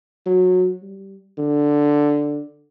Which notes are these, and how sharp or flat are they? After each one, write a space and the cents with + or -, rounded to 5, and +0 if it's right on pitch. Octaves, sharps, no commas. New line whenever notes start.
F#3 -20
G3 -15
D3 +0